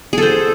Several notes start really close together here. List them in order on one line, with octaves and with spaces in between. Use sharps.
G#4 A4 C5